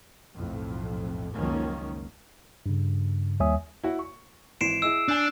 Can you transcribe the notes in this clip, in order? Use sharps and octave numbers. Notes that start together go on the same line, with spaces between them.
B1 F2 A2
C#2 F#2 D#3 F3 A#3 C#4
G2 C#3
D#2 G3 C#5 E5 G#5 D#6
E4 F#4
C#6
G#1 E3 C6 C7 D7 E7
E4 G#4 D#5 E6
D4 G#5 G6